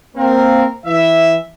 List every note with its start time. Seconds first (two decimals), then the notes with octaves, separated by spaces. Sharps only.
0.16 A#3 C4 A#4
0.85 E3 E5